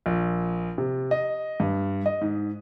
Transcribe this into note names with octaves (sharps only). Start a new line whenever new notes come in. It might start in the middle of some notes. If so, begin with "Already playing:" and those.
A#1
C3
D#5
G2
D#5
G#2